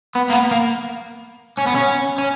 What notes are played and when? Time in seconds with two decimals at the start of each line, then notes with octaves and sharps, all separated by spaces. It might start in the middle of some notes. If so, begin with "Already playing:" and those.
0.16 B3
0.30 A#3
0.33 B3
0.51 A#3
1.57 C#4
1.66 B3
1.75 C#4
2.18 C#4